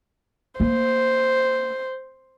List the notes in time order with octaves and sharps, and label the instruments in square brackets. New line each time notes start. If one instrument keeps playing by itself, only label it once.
[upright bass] A#3 [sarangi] C5